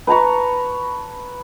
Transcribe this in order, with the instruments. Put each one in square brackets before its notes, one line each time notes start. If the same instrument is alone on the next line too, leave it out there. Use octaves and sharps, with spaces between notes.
[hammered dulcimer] B4 A5 A#5 C#6